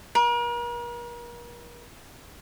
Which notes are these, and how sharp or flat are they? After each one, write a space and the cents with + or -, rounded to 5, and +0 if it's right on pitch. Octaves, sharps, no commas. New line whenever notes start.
A#4 +40